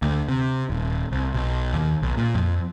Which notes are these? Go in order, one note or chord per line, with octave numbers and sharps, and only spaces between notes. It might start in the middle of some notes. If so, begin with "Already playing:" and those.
D2
C3
D#1
C2
B1
D#2
B1
A#2
F2